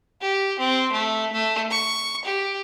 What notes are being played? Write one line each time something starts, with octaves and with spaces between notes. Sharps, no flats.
G4
C4
A3
A3
C#6
G4